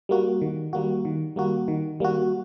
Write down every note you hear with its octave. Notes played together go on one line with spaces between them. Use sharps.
G3 A#3 F#4
D#3
G3 A#3 F#4
D#3
G3 A#3 F#4
D#3
G3 A#3 F#4